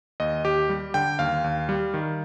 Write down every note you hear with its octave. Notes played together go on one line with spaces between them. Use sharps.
D#2 D#5
D#2 G4
G3
D3 G5
D#2 F5
D#2
G3
D#3